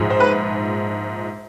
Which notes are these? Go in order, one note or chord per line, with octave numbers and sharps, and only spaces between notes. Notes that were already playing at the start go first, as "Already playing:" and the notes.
Already playing: A#1 G#2 F3 G#3
C5
B4